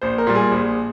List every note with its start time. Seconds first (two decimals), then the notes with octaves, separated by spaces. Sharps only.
0.01 A#1 C5
0.18 A#4
0.27 A#2 G3
0.35 G#4
0.52 A#1